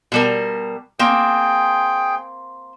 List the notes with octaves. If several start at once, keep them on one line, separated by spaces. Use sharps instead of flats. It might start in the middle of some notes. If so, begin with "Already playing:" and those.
B2 G3 A#4
A#3 C4 G#4 G5